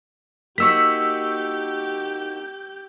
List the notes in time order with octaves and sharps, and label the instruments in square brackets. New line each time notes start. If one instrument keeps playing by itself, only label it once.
[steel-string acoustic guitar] A#3 D#4 F#4 [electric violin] G4 G6 [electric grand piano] C#6 E6 B6